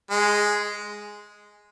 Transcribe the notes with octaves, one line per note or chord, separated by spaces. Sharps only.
G#3